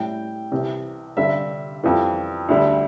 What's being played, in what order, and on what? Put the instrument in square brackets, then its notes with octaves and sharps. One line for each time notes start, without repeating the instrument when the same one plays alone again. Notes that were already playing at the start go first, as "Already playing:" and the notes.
Already playing: [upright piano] A2 G3 G5
C2 C3 E3
G2 D3 G3 E5
F2 E3 G3
D2 D3 G3